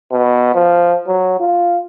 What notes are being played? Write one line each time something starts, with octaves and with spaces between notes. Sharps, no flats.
B2
F3
F#3
F4